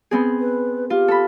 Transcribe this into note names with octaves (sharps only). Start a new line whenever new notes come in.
B3 C4 G#4
B4
F4 G4
A4 B5